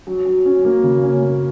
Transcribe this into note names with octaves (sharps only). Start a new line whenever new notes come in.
F#3
F#3
C#4
A#3
C#3
C#4
A#3